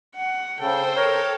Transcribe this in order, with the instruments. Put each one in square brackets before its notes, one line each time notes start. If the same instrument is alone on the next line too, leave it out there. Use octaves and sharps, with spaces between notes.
[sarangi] F#5
[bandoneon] C#3 [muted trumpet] A4 [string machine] C5 [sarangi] G5
[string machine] A4 [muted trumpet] A#4 [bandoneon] C#5